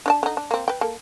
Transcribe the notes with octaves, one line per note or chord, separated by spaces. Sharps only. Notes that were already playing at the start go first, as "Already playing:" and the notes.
D4 D5 A5
D3 D#4
D4
A#3 C4
B4 G5
A#3 A4